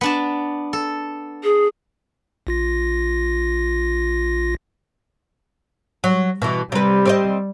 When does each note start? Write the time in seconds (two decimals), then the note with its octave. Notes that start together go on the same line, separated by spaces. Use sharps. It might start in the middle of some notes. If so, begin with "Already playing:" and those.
0.01 B3 D4 A5
0.73 A4
1.43 G#4
2.47 A#1 F4 A#6
6.04 F#3
6.42 B2 E3
6.72 C3 G3 B4
7.06 C4 D5 D#5